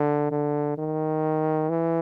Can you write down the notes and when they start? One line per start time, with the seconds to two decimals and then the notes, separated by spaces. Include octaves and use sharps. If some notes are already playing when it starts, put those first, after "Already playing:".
Already playing: D3
0.31 D3
0.78 D#3
1.70 E3